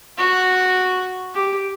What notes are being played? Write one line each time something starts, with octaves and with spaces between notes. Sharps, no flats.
F#4
G4